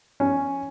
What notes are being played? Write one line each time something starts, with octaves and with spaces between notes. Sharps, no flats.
C#4